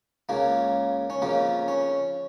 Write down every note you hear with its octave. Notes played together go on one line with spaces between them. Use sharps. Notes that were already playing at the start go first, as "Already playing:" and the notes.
C#2 C#3 A#3
C#4
F2 C#3 A#3
C#4